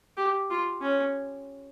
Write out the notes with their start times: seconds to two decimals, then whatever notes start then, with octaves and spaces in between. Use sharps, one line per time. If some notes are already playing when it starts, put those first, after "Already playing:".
0.17 G4
0.50 F4
0.82 C#4